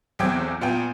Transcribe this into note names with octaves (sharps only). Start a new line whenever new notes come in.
B1 E2 C4 G5 D6 G#6
A#2 B3 F4 G5